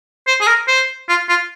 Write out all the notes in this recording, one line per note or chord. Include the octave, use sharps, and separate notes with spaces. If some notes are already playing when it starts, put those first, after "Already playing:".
C5
G#4
A#4
C5
F4
F4